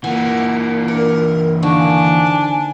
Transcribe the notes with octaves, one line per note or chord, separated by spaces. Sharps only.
A#2 E3 A#3 F#5 G#5
D4 A#4
D3 D#3 F3 D4 C#6
G#5